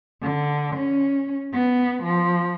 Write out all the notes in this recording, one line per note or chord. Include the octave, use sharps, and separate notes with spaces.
D3
C#4
B3
F3